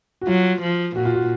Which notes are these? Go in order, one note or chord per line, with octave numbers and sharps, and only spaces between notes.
F#4
F#3 F4
F3
A#2 F#4
F4
F#4